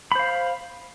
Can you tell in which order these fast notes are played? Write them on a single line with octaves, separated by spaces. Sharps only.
B5 C5 F5